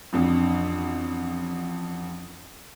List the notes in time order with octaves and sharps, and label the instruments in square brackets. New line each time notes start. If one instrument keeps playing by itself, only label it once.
[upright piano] A1 F2 D4